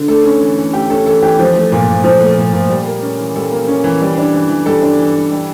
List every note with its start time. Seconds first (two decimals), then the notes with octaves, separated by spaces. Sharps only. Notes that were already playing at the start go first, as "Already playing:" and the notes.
Already playing: D3
0.08 A3 A4
0.25 C#4
0.41 E3
0.58 E3
0.73 A3 G4
0.90 C#4 A4
1.06 E3 A4
1.23 E3 G4
1.39 F3
1.55 A3
1.72 A#2
1.88 A#2
2.04 F3
2.21 A3
2.37 A#2
2.53 A#2
2.70 G3
2.86 A#3
3.02 C#4
3.19 E3
3.35 G3 A4
3.51 A#3
3.68 C#4
3.84 E3
4.01 G3
4.18 D4
4.34 E3
4.49 E3
4.66 G3 A4
4.82 D4
4.98 E3
5.15 E3
5.31 G3